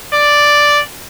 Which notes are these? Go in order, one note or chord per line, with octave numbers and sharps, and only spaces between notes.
D5